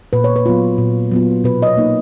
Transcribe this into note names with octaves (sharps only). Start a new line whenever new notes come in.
A#2 B4
C#5
B4
F#3 B3 F4
A#2
F#3 B3 F4
B2 B4
D#5
C#5
A#3 D#4